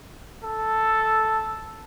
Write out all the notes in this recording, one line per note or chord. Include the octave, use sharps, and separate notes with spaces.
A4